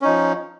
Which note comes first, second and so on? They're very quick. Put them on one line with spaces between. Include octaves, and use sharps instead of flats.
C#4 D#4 F3